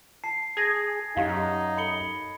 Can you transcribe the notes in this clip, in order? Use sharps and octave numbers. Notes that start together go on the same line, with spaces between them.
A5 C7
G#4 G#6 A#6
F#2 D#4 G4 F5
A4 B5 C#7 G7